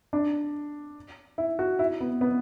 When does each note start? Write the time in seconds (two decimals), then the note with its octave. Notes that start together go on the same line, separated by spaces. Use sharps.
0.13 D4
1.38 E4
1.59 F#4
1.79 E4
2.00 B3
2.21 B3